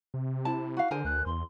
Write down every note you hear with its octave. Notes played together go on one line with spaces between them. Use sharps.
C3
E4 A5
F#4 F5
D3 G#4 A#4 C5 G#5
D2 F#6
E2 C6